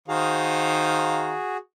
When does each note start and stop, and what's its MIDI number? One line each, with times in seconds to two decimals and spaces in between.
0.08 1.35 51
0.08 1.57 66
0.08 1.57 68
0.08 1.35 72
0.08 1.35 77